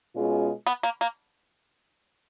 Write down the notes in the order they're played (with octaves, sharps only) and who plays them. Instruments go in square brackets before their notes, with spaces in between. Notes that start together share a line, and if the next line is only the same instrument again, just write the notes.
[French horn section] B2 G#3 C#4 F4 G#4
[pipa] B3
A#3
A#3